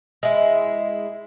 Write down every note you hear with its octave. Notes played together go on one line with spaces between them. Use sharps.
G#3 E4